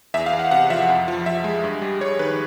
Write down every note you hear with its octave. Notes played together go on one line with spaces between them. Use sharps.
E2 E5
F5
E2
F#5
C3 F#5
F3 E5
F2
F3
F3 E5
G#3
G2
G3
G3 C#5
D#3 B4